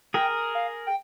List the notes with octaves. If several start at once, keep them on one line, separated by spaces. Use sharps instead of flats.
G#4 A#4 G5
F5
G5